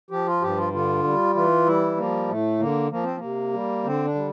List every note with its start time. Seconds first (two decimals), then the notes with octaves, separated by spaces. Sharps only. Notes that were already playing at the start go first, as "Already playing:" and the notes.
0.10 F3 G4
0.26 F4
0.42 G2 G4
0.57 F4
0.73 D3 F4
1.04 G3
1.35 E3 F4
1.66 G3 E4
1.97 F3 A#3
2.28 A2 A3
2.59 D3 A#3
2.91 F3 A#3
3.03 C4
3.17 C3 A#3
3.53 G3
3.84 D3 C4
4.05 D4
4.15 G3